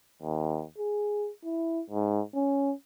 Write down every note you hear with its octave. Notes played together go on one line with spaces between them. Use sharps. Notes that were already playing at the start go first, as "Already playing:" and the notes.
D#2
G#4
E4
G#2
C#4